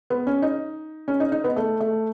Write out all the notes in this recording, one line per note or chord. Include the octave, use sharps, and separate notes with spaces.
B3
C#4
D#4
C#4
D#4
D#4
B3
A3
A3